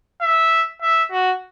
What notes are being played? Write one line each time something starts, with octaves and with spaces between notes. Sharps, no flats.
E5
E5
F#4